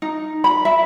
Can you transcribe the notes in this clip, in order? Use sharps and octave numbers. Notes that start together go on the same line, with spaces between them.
D#4
B5
E5